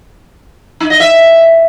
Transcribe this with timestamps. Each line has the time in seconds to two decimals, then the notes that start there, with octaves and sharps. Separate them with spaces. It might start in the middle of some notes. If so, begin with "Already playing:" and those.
0.80 D#4
0.90 D#5
1.00 E5